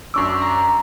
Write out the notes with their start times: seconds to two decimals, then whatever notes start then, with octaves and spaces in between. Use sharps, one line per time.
0.14 F#2 D4 C#6 D6 E6
0.42 A#5